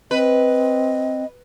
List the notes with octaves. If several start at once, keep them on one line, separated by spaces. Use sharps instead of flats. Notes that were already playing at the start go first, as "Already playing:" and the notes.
C4 B4 D#5